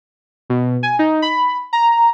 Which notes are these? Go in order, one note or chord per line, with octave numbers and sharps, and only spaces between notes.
B2
G#5
D#4
B5
A#5